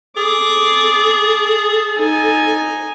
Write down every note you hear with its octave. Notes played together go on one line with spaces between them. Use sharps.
G#4 A4 D6
D#4 G#5